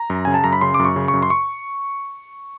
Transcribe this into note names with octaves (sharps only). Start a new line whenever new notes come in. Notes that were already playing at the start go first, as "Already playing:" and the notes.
Already playing: A#5
F#2
C#3 G#5
A5
F#2 A#5
B5
C#3 C6
F#2 D6
C#6
C#3
C#6
F#2
C6
C#6